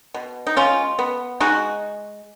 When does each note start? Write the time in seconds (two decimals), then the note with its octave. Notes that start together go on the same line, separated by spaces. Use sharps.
0.14 B2
0.47 D#4
0.56 G#3 C#4 F4
0.99 B3
1.40 G#3 D#4 F#4